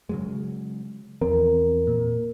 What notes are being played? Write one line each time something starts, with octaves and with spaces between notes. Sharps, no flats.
C#3 F#3 G#3
E2 F3 C4 A#4
A#2